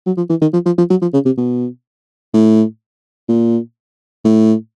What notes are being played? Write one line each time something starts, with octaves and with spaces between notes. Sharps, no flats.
F#3
F3
E3
D#3
F3
F3
F3
F#3
F3
C#3
C3
B2
A2
A#2
A2